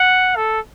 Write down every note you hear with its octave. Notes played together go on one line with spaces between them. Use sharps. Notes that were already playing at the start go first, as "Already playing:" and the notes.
Already playing: F#5
A4